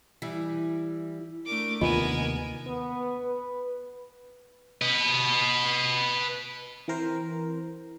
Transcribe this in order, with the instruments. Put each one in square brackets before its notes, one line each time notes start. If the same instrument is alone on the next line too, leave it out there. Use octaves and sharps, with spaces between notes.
[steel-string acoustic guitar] E3 G3
[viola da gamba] A3 D4 A#4 [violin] D6
[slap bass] D#2 C3 D#3 [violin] B3 G#5 [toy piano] F4 D#5 [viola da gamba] A#4
[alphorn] B3
B4
[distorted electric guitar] B4 D#5
[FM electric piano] E3 C4 A#4 C5